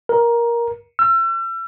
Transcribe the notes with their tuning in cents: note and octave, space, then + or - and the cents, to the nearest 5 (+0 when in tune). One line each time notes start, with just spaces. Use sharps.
A#4 +15
E6 +40